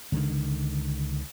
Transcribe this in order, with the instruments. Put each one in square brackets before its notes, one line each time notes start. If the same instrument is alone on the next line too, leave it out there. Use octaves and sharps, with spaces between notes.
[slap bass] C#2 D3 D#3